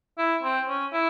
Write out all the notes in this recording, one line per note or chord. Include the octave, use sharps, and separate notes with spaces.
E4
C4
C#4
E4